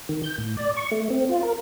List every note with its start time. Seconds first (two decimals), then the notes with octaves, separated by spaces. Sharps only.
0.09 D#3
0.24 G6
0.38 A2
0.57 D5
0.77 C#6
0.91 A3
1.10 C4
1.29 F4
1.43 A#4